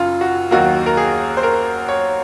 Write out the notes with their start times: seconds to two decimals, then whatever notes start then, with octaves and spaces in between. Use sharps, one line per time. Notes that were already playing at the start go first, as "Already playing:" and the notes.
Already playing: F#1 F#2 F4
0.21 F#4
0.51 D#2 D#3 F#3 A#3 F#4
0.86 A#4
0.97 G#4
1.37 C5
1.43 A#4
1.89 C#5